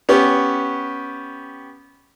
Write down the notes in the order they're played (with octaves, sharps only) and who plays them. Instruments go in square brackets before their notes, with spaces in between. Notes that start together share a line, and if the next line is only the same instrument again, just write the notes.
[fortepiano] B3 C#4 G4